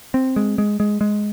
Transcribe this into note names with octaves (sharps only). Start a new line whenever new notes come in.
C4
G#3
G#3
G#3
G#3